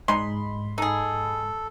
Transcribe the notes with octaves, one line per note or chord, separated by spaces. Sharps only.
G#2 G#3 D#4 B5 C6
D#4 G#4 A4